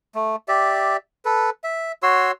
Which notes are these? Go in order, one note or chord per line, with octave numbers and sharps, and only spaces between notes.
A3
G4 D5 E5
A4 B4
E5
F#4 C#5 C6 E6